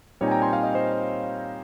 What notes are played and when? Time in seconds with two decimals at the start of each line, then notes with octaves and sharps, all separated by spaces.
0.21 A#2 G3 C4 D#4 C#5
0.28 G#5
0.31 G5 A#5
0.42 G#5 C6
0.53 F5 G#5
0.63 D#5 G5
0.74 C5 D#5